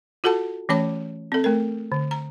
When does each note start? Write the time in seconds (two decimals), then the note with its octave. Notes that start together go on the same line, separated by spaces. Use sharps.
0.24 F4 F#4 A4 F#5 A5
0.69 E3 A3 C#4 C#5 A5 D6
1.32 C4 A4
1.44 A3 A#4
1.92 D3
2.11 A#5